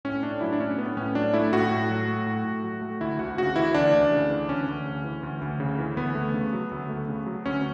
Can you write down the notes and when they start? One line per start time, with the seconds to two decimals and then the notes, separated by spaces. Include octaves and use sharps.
0.05 A2 C#4
0.23 A2 D4
0.41 F#3 E4
0.53 D4
0.60 A3 C#4
0.78 A2 B3
0.97 A2 C#4
1.15 F#3 D4
1.34 A3 E4
1.53 A2 F#4
1.71 A2
1.90 F#3
2.08 A3
2.26 A2
2.45 A2
2.63 F#3
2.82 A3
3.01 D2 E4
3.19 D2 F#4
3.38 C#3 F#4
3.56 E3 E4
3.74 D2 D4
3.93 D2
4.12 C#3
4.30 E3
4.49 D2 C#4
4.67 D2
4.85 C#3
5.04 E3
5.23 D2
5.41 D2
5.60 C#3
5.79 E3
5.97 D2 B3
6.15 A3
6.34 C#3
6.53 F#3
6.71 D2
6.89 A3
7.09 C#3
7.26 F#3
7.45 D2 C#4